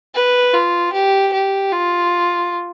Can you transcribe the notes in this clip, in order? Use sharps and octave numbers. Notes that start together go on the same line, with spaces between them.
B4
F4
G4
G4
F4